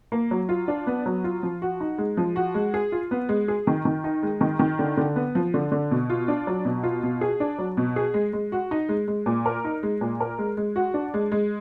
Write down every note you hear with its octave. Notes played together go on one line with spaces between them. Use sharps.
A#3
F#3
F4
D4
B3
F#3
F4
F3
F#4
D#4
G#3
F3
F#4
G#3
G#4
F4
B3
G#3
G#4
D#3
D#3
D#4
G#3
D#3
D#3
D3
D3
B3
F3
D3
D3
B2
F4
D4
F#3
B2
F4
B2
G#4
D4
F#3
B2
G#4
G#3
G#3
F#4
D#4
G#3
G#3
A#2
A#4
D#4
G#3
A#2
A#4
G#3
G#3
F#4
D4
G#3
G#3